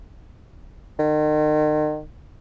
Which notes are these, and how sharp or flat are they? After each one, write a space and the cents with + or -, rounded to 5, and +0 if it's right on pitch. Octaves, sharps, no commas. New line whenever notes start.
D#3 -40